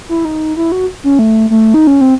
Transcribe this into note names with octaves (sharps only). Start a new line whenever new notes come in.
E4
D#4
E4
F#4
C#4
A3
A3
D#4
C#4
C4